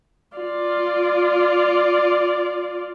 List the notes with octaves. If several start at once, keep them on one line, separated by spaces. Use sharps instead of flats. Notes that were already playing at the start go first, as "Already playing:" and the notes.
F4 D5